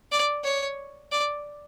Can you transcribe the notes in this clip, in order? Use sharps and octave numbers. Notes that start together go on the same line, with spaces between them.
D5
C#5
D5